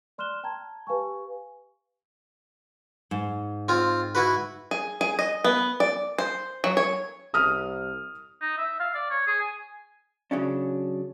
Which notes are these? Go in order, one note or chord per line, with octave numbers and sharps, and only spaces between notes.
D5 C6 F6 F#6 E7 G7
G5 A5 A#5 G#6
G4 B4 F5 G#5 C#6
G#2
C4 F4
E4 F#4 B4
G#4
G#4
D#5
B3
D5
C5
F#3
C#5
C2 D#6 F6
D#4
E5
F5
D5
C#5
G#4
G#5
C#3 F#3 C#4 D4